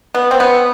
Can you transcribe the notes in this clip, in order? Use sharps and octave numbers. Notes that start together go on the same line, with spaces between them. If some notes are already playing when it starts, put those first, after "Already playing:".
B3
C4
B3